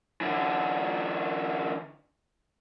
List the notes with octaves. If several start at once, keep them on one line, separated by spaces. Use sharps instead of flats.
D3 E3